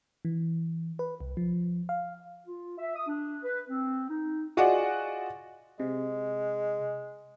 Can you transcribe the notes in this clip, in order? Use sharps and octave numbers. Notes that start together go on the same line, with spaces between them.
E3
B4
C2
F3
F5
F4
E5
D#6
D4
B4
C4
D#4
F4 F#4 G#4 D5 D#5 F#5
C3 G#3